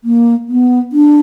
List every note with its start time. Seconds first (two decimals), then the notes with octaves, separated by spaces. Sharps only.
0.04 A#3
0.49 B3
0.92 D4